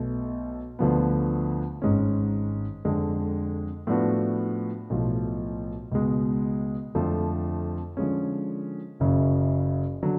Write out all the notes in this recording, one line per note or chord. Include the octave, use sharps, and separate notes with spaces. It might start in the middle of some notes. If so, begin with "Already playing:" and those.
Already playing: B1 B2 A3
D2 D3 F3 B3
G#1 G#2 G#3 C#4
F2 D3 G#3
A2 F3 B3 D4 F#4
B1 A2 F3
C#2 B2 G#3
F2 D3 F3 A3
D3 F3 G#3 C#4
F#1 F#2 C#3
D3 F#3